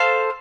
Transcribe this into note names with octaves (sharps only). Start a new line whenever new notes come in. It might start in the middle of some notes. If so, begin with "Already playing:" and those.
Already playing: A4 C5 F5